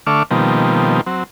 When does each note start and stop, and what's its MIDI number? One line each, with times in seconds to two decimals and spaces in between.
0.07 0.23 50
0.07 0.23 57
0.07 0.23 76
0.07 0.23 85
0.07 0.23 86
0.07 0.23 89
0.31 1.01 47
0.31 1.01 51
0.31 1.01 53
0.31 1.01 55
0.31 1.01 58
0.31 1.01 60
1.07 1.24 54
1.07 1.24 60